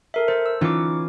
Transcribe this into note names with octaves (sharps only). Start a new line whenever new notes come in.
A4 A#4 E5
A4 C5
E6
E3 C#4 D#4 F4 D6